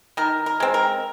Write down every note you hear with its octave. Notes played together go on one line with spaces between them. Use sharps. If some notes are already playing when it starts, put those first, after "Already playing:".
D#3 A#4
A#4
G#3 C4
A#4